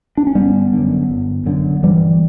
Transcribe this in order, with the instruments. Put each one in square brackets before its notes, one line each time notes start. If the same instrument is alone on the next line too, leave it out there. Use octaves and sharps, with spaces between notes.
[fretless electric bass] D4
C#4
G1 G3 B3
F#2 D3
G1
F#2 D3
G1 E3 G3